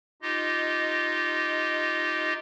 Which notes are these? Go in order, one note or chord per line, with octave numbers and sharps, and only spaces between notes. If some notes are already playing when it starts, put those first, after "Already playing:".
D#4 F4 G4 D#5